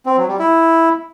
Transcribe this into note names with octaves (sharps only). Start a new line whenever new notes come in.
C4
F#3
G3
E4